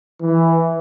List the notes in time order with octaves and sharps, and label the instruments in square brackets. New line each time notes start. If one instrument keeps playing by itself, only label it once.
[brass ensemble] E3